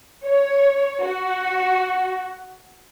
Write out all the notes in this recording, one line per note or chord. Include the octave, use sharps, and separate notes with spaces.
C#5
F#4